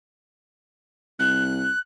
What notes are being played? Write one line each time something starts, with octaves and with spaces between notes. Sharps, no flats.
C2 F#6